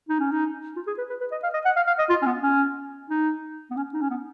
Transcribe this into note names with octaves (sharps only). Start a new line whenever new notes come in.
D#4
C#4
D#4
F4
G#4
B4
B4
B4
D#5
F5
D#5
F#5
F5
F5
D#5
F4
C#4
B3
C#4
D#4
B3
C#4
D#4
C#4
B3